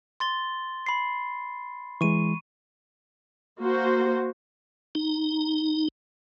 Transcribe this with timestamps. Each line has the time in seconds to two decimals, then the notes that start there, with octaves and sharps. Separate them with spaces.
0.20 C6 A6 G7
0.86 B5 C7
2.01 E3 G#3 C#6 D#7
3.58 A#3 F#4 C5
4.95 D#4